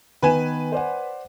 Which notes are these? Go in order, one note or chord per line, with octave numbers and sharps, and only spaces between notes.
D#3 B3 B4 G#5 E7
C5 D5 F#5